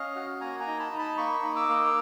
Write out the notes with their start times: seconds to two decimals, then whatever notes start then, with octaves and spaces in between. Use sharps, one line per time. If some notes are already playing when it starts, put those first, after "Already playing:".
Already playing: C#4 D#5 F5
0.15 F#4
0.41 A#3 G#5 A#5
0.60 G#5 A#5
0.67 D#4
0.79 A5 B5
0.92 D#4
0.99 A5 B5
1.18 A#3 B5 C#6
1.43 D#4
1.56 D6 E6
1.69 A#3